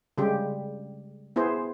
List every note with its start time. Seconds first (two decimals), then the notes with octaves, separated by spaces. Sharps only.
0.18 C#3 G3 G#3 G4
1.36 B3 E4 G#4 C5